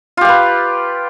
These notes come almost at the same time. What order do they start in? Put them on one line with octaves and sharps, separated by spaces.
F4 G4 F5 B4